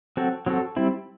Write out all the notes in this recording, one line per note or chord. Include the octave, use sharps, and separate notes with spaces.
F#3 C4 F#4 A4
F#3 C4 F#4 A4
G3 C4 E4